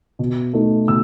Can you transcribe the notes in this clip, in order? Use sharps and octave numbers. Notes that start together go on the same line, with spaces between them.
B2
A3 D#4
B2 E6